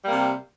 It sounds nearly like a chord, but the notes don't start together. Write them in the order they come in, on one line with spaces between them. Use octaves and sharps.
G3 A#3 C3